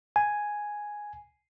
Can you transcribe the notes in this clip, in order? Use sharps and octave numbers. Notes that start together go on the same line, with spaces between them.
G#5